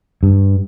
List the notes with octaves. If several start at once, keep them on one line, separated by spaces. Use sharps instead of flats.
G2